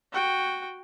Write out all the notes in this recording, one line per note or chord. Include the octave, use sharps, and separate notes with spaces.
F#4 G5